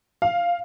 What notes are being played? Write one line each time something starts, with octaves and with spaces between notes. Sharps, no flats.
F5